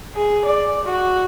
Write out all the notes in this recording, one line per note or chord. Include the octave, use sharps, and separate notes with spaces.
G#4
D5
F#4